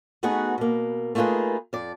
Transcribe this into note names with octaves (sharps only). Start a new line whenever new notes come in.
A3 B3 D#4 F#4 G#4 B4
B2 A#3
A3 A#3 D#4 F4 G#4 B4
F2 D5